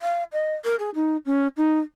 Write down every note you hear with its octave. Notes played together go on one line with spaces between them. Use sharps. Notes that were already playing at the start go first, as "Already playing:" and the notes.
F5
D#5
A#4
G#4
D#4
C#4
D#4